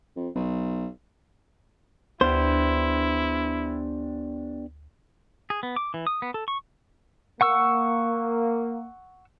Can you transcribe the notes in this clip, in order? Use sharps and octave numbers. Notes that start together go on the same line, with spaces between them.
F2
B1
D2 B3 D4 E4 G4 C5
G#4
B3
D6
E3
D#6
B3
A4
C#6
A#3 F#5 C#6 E6